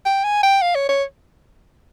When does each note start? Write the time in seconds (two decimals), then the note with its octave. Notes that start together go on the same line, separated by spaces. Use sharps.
0.06 G5
0.24 G#5
0.43 G5
0.62 F5
0.75 C#5
0.89 C#5